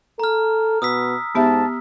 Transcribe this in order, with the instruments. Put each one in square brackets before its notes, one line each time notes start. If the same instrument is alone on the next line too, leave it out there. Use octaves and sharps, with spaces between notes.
[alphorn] A4 [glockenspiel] A#5 F6
[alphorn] B2 [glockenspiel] D#6 E6 B6
[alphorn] G#2 [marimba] B3 G4 E5 [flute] A5